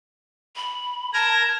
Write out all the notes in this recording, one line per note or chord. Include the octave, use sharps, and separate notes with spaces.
B5
A#4 A5 A#5 G#6 A#6